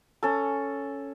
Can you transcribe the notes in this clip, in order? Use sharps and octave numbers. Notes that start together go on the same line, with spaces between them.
C#4 A4